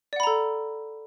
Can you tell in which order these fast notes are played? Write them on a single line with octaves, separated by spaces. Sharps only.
D5 F#5 B5 A#5 A4